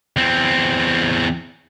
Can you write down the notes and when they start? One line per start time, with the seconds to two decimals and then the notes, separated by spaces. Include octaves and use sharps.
0.17 E2 C4